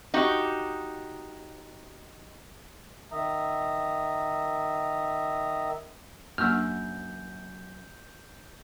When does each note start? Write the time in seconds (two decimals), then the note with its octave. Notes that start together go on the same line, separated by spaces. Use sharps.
0.14 D#4 F#4 G4
3.12 D#3 E5 A#5 D#6
6.38 F#2 A#3 D4 F#5 E6 F6 G6